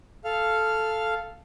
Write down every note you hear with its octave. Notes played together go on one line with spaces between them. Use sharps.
A4 F5 F6